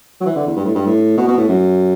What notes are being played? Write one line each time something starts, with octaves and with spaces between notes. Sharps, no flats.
F#3
E3
D3
E2
G2
A2
G2
A2
B2
B2
A2
F#2